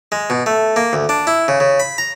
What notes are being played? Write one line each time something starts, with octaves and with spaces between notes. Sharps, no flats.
G#3
B2
A3
A#3
D2
D4
E4
C#3
C#3
B5
A#5